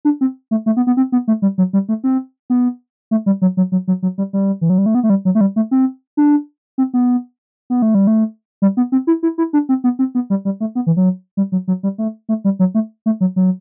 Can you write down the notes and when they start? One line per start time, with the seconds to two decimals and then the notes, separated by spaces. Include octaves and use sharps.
0.05 D4
0.21 C4
0.51 A3
0.66 A3
0.77 B3
0.87 B3
0.97 C4
1.12 B3
1.28 A3
1.42 G3
1.58 F#3
1.73 G3
1.89 A3
2.04 C4
2.50 B3
3.11 A3
3.26 G3
3.42 F#3
3.57 F#3
3.72 F#3
3.88 F#3
4.03 F#3
4.18 G3
4.33 G3
4.61 E3
4.70 F#3
4.78 G3
4.86 A3
4.95 B3
5.03 A3
5.10 G3
5.25 F#3
5.35 A3
5.41 G3
5.56 A3
5.71 C4
6.17 D4
6.78 C4
6.94 B3
7.70 B3
7.82 A3
7.95 G3
8.07 A3
8.62 G3
8.77 B3
8.92 C4
9.07 E4
9.23 E4
9.38 E4
9.53 D4
9.69 C4
9.84 B3
9.99 C4
10.15 B3
10.30 G3
10.45 G3
10.60 A3
10.75 B3
10.87 E3
10.97 F#3
11.37 G3
11.52 F#3
11.68 F#3
11.83 G3
11.98 A3
12.29 A3
12.44 G3
12.59 F#3
12.75 A3
13.06 A3
13.21 F#3
13.36 F#3